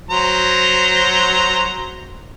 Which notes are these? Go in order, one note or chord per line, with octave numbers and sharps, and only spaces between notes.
F#3 C5 A#5